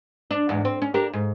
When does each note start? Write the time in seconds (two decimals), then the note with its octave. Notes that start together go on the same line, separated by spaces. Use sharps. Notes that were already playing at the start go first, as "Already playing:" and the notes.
0.31 D4
0.49 E2 G#2
0.65 C4
0.82 C#4
0.94 D4 G4 A#4
1.13 G#2